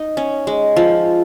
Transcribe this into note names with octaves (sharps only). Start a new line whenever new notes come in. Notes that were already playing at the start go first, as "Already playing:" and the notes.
Already playing: D#4
C#4
G#3
F3